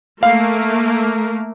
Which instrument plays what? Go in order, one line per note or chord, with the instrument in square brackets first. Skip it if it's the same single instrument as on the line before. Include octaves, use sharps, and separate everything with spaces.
[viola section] A3 A#3 [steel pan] F5